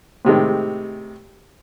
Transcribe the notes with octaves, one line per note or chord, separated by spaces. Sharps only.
A2 C3 D#3 G#3